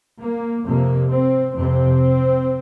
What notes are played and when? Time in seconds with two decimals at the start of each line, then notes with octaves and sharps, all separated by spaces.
0.19 A#3
0.65 F2 C3 A#3
1.10 C4
1.56 F2 C3 C4